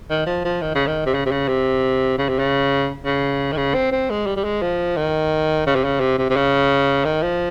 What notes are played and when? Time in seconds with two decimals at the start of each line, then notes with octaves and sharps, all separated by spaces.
0.10 D#3
0.27 F3
0.44 F3
0.62 D#3
0.75 C#3
0.87 D#3
1.06 C3
1.14 C#3
1.26 C3
1.32 C#3
1.48 C3
2.18 C#3
2.29 C3
2.39 C#3
3.05 C#3
3.53 D#3
3.57 C#3
3.75 C4
3.92 C4
4.10 G#3
4.26 G3
4.37 G3
4.44 G#3
4.62 F3
4.97 D#3
5.67 C#3
5.75 C3
5.84 C#3
6.00 C3
6.18 C3
6.30 C3
6.36 C#3
7.05 D#3
7.22 F3